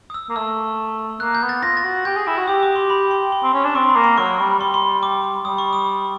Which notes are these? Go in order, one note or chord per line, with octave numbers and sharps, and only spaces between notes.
D#6
E6
A#3
A3 E6
A#3 F#6
G6
B3
A6
F4 A#6
A6
F#4
G4 G6
G#4
E4
F#4
G4 D#6
D6
C6
B5
C6
C6
C4
C#4
D4
C4 C#6
B5
A#3
C6
F#3 C#6
G3
G3 C6
C6
D6
G3 D#6
C#6
D#6